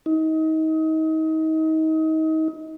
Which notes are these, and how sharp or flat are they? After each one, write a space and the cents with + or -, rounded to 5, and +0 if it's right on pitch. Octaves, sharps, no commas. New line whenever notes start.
D#4 +30